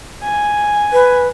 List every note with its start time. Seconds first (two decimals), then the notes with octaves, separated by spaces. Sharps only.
0.23 G#5
0.93 B4